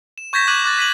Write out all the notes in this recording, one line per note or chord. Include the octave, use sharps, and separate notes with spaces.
E7
C#6 G6 G#6 A#6 B6 E7
D6 F#6 G#6 D#7 E7 F#7
D6 F#6 A6
F#6 B6 D#7 F#7